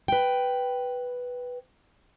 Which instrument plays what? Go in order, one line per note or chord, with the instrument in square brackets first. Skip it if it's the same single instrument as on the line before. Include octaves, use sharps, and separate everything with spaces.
[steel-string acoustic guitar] B4 G5